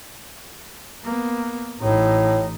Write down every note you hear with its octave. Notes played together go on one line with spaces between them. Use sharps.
A#3 B3
A1 A2 D#4